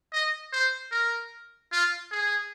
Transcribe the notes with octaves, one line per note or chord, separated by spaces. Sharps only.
D#5
C5
A#4
F4
G#4